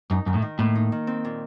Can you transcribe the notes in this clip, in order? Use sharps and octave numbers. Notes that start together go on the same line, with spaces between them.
F#2 D#4
F#2 D#3
A2
D#3
A2 A#3
D#4
D#3
C4
A#2